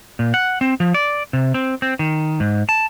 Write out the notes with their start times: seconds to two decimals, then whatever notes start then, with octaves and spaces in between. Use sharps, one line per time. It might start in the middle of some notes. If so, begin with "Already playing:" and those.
0.19 A#2
0.34 F#5
0.61 C4
0.80 F3
0.94 D5
1.33 C3
1.54 C4
1.82 C4
1.99 D#3
2.40 G#2
2.69 A5